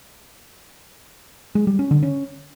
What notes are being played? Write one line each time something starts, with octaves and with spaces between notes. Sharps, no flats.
G#3
G3
C#4
D3
C#4